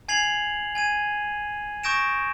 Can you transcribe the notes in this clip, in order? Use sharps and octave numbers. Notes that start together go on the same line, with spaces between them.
G#5 G#6 C7 F7 F#7
G#5 G#6 D#7
C#6 D#6 G6 A#6 D7 E7